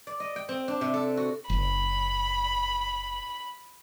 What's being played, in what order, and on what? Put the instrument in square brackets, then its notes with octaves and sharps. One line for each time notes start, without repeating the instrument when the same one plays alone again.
[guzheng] D5
D#5
G5
C4
D4
C3
A4
F#4
[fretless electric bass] F#1 [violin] B5